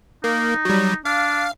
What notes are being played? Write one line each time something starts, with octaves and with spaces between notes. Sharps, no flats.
A#3 D#4
F#3 G3
D4 F5